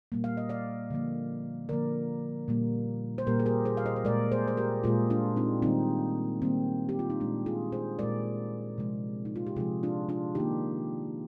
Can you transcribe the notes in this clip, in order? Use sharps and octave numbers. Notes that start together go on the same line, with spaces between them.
A#2 G3 A#3
F5
D#5
D5 F5
D3 F3 A#3
D3 F3 A#3 A#4 D5
A#2 G3 A#3
C5
A#2 G3 A#3 G4 A#4
G#4
G4 A#4
G#4 C5
F5
C5 D#5
C5
A#2 G#3 A#4 D5
G#4 C5
C5
G4 A#4
A#2 G#3 F4 G#4
D4 F4
C4 D#4
D#3 G3 A#3 C4 D#4
D#3 G3 A#3 C4
G4
F4
D#4
A#2 G#3 D4
F4 G#4
G#4 C5
A#2 G#3 A#4 D5
C3 F3 G#3
D#4
F4
G4
C3 F3 G#3 F4 G#4
D4 F4
D4 F4
D#3 A#3 D#4 G4